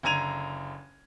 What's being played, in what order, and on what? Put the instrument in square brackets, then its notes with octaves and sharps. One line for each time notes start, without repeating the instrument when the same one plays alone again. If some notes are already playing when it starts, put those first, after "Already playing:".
[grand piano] F#1 D3 A#5 G#6 D#7 F7